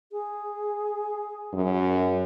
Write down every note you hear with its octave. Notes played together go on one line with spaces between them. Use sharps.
G#4
F#2